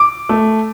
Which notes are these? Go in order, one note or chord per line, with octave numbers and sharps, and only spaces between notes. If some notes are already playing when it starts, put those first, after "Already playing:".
Already playing: D6
A3